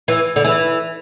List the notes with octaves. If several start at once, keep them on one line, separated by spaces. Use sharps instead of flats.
E3
D3
E3